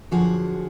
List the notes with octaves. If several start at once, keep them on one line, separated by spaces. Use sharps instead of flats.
F#2 D3 F3 F#4 G#4